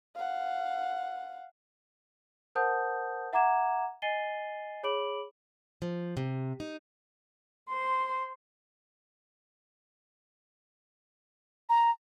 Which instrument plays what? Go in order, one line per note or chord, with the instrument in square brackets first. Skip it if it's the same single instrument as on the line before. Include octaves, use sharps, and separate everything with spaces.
[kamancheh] F5 F#5
[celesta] A#4 C5 F#5 A5 D#6 G6
E5 F#5 A#5 D6 G#6 E7
D#5 G#5 A6 C7 D#7 G7
G#4 C#5 B5 D6 D7 F#7
[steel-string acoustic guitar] F3
C3
D#4
[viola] C5 C6
[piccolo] A#5